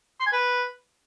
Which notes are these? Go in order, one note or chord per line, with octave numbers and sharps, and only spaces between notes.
C6
G#5
B4